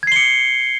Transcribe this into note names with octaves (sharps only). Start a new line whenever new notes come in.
G#6 C7 C#7 G7